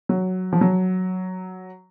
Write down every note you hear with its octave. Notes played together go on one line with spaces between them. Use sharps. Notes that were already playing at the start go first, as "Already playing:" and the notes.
F#3
F3
F#3